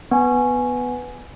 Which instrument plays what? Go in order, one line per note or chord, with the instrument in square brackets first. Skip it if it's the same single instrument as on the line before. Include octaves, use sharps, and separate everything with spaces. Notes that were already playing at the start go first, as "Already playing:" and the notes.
[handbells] B3 G#5